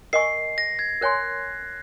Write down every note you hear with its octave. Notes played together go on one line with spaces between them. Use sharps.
A#4 D#5 G#5 C#6 C7
A#6
G#6
A#4 C#5 G#5 C6 F#6